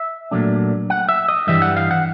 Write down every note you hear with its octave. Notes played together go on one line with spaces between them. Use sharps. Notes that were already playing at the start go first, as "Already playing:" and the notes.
Already playing: E5
A#2 F#3 A3 D4
F#5
E5
D#5
G2 E3 G3 E5
F#5
F5
F#5